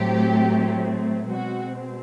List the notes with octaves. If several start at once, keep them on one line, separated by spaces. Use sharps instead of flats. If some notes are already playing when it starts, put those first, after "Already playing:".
Already playing: A2 F#3 A3 C4 G4
B2 G#3 C4 F#4